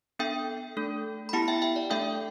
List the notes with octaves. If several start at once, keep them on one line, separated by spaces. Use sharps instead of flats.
B3 D4 A4 E5 G5
A3 D4 A4
B5
B3 E4 G4 F#5 A5
E5 G5
E5 G5
D5
A3 D4 A4 E5 G5